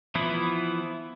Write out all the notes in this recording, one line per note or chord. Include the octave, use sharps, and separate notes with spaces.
E3 F3 B3 E4